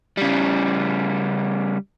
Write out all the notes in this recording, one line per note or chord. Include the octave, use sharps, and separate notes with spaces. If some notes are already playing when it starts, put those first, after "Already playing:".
C#3 G3